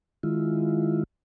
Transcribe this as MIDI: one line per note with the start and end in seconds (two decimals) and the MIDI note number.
0.23 1.03 51
0.23 1.03 56
0.23 1.03 64
0.23 1.03 65